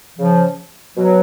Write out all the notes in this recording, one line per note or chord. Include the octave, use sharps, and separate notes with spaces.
C#3 F3
B2 F#3